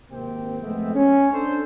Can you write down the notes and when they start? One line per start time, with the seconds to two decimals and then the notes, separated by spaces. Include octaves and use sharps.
0.11 G#1 C3 A#3 C4 G4 G5
0.60 F2 G#3 A3 B3 C4 E5
0.94 C#4
1.32 D4 A4 C5